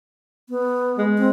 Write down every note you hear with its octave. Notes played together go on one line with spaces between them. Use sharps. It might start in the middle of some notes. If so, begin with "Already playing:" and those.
B3
G#3
C4